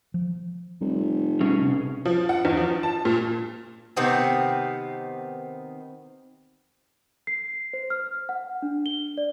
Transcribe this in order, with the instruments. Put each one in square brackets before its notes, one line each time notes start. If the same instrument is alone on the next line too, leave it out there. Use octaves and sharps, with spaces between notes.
[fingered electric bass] F3
[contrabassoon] F1 [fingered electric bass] G3
[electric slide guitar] B2 C#4 G#4 [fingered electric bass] G3
[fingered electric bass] C3
[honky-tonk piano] F3
F#5
E2
F3
A5
A#2
[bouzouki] C3 D#3 B3 C4
[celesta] C7
C5
F6
F#5
D4
G7
D5